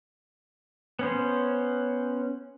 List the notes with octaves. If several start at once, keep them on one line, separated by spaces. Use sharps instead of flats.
B3 C#4 C5